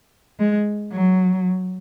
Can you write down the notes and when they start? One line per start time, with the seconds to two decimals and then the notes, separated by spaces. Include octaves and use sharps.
0.39 G#3
0.92 F#3